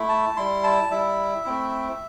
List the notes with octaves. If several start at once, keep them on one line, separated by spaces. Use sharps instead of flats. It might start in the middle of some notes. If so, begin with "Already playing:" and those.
Already playing: A3 E4
A5
G3 E4 C6
A5
G3 E4 E5
A3 C4 E4